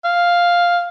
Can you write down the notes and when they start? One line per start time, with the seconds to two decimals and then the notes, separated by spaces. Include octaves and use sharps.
0.05 F5